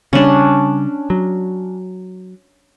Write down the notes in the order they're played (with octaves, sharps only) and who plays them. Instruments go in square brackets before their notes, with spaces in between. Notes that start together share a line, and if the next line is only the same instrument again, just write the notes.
[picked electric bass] C#3 G3 [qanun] C#4 D4
[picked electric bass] F#3